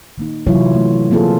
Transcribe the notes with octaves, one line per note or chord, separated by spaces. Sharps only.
D#3 A#3 D#4
C3 E3 F#3 E4 F4 C#5
A3
F3 A#3 C4 F4 G#4 A4